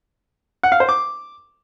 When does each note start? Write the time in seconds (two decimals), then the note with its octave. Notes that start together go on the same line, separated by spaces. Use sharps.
0.63 F#5
0.72 F5
0.80 C5
0.89 D6